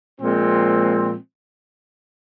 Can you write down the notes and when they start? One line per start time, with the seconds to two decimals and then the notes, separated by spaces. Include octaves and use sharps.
0.21 A#2 F3 G#3 C4